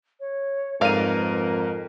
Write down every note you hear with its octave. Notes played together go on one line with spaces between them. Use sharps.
C#5
F2 G#2 A#4 B4 D5 F5 D#7